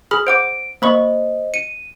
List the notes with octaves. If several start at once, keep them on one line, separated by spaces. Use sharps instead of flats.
G#4 B5 F6
C5 F#5 D6 D7
A#3 C5 D#5 B5 C#6
C#7 D#7